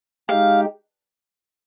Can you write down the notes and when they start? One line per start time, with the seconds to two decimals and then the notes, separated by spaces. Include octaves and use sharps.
0.29 G#3 D#4 G4 F5